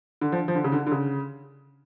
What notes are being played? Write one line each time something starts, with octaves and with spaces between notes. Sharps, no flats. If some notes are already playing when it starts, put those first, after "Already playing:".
D3
F3
F3
D3
C#3
D3
D3
C#3